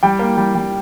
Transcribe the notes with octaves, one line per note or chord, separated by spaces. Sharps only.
G3 G5
A#3
G3
G3